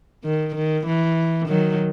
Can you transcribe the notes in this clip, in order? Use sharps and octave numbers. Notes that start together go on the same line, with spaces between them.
D#3
D#3
E3
D#3 F#3